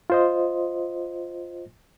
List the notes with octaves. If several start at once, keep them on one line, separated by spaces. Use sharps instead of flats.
F4 C5 D#5